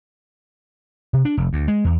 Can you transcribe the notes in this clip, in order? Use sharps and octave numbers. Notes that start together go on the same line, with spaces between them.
C3
D4
F1
D2
G#3
E2